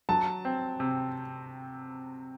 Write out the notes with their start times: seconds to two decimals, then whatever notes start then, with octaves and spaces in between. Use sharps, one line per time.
0.09 F#3 A5
0.45 C4
0.80 C3